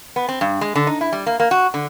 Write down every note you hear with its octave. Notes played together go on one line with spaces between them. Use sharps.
B3
C4
G2
G#3
D3
D#4
E4
G3
A#3
A#3
F#4
D3